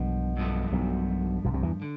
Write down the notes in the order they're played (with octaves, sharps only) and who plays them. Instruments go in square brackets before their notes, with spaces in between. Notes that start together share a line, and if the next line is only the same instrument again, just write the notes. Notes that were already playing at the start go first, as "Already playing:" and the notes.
Already playing: [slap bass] B1 B2 [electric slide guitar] G2 F3
[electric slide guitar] G2 F3 A3
[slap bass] B1 B2
B1 B2
C2 C3
E2 E3
[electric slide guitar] D3